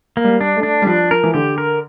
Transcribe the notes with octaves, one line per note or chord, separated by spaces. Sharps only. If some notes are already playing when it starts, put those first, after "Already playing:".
A#3
G3
D4
A3
D4
G3
F3 D4
A#4
E3
D3 G4
A#4